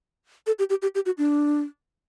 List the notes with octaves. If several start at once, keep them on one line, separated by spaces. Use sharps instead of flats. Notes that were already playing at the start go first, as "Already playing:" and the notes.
A4
G4
G4
G4
G4
F#4
D4